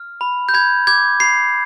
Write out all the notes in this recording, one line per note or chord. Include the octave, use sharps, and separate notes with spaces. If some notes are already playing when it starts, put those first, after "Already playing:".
Already playing: F6
B5
G6
B5 G#6
D6 G#6
B5 C7